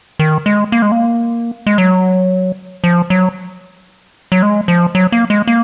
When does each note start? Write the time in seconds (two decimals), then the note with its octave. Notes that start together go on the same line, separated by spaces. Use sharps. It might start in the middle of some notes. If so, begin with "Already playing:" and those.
0.19 D#3
0.46 G#3
0.72 A#3
0.82 G#3
0.92 A#3
1.67 G#3
1.78 F#3
2.84 F3
3.10 F#3
4.32 F#3
4.42 G#3
4.68 F3
4.95 F#3
5.12 A#3
5.30 G#3
5.47 A#3